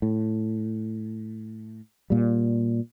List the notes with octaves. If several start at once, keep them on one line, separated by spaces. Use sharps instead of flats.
A2
A#2 G3